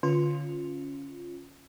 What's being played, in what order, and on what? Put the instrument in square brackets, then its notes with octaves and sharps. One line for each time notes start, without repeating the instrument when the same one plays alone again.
[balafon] D3 [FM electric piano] C#4 F4